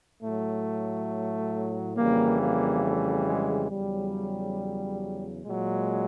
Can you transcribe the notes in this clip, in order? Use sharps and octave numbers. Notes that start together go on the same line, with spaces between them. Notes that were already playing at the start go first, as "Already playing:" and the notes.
A2 F#3 A3
F2 C#3 E3 G3 A#3
A#3
A3
G#3
E2 C#3 F#3 G3
A#2 F#3 G#3